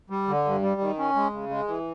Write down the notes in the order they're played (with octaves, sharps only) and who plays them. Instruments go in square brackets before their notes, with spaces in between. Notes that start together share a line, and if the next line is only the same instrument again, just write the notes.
[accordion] G3
D3
G2
G3
D#3
C#4
G#3
C#3
G#3
E3